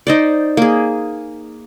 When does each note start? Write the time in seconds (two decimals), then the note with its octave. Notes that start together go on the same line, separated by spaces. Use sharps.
0.07 D#4 C5 D5
0.57 A#3 G#4